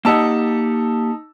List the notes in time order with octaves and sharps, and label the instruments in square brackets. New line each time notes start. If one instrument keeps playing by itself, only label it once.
[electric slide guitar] A#3 G4 F#5 [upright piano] D#4 A5 E6